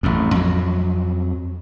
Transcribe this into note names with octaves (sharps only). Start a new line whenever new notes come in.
A1 F2
F2 F#3